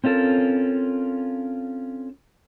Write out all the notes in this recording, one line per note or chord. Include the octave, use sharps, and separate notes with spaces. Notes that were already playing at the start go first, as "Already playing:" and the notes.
C4 C#4 F4 A4 A#4